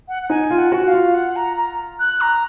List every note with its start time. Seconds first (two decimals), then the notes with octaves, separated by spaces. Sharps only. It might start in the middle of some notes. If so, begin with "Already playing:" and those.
0.08 F#5
0.23 F#5
0.30 D#4 G#5
0.50 F4
0.58 F#5
0.72 F#4
0.86 F5
0.93 F4
1.14 F#5
1.36 A#5
1.57 A#5
2.00 F#6
2.21 A#5